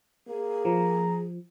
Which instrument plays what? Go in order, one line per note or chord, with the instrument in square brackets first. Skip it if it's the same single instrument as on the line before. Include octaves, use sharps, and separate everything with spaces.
[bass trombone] A#3 [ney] G#4
[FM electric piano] F3 [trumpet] A#5